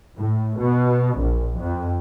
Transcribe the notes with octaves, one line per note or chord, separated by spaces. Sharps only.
A2
B2
A#1
F2